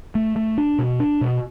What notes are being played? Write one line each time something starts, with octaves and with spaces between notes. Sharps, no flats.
A3
A3
D4
B2
D4
B2